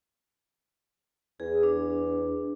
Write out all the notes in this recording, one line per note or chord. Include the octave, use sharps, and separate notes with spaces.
E2 G#4
D4